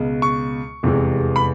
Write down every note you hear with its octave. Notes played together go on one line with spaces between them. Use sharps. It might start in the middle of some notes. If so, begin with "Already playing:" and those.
Already playing: C#2 B2 G#3
C#6
F1 E2 C3 E3 G#3
B5